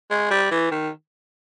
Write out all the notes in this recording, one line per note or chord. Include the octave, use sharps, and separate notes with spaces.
G#3
G3
E3
D#3